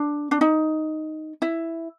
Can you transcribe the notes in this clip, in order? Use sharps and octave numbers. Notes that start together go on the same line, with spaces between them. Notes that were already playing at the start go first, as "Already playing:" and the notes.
Already playing: D4
D4
D#4
E4